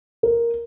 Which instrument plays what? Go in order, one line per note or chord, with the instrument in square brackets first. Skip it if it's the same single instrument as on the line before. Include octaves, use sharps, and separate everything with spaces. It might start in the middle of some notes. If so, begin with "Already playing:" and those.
[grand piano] A#4